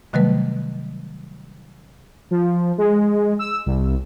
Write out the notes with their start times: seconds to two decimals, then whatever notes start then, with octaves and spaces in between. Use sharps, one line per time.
0.13 C3 D#3 F#3 G3 A3 B4
2.31 F3
2.78 G#3
3.39 E6
3.66 C2